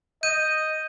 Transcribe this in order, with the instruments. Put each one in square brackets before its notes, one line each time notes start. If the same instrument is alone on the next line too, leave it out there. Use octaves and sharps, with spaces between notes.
[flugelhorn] D#5 [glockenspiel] G6 D#7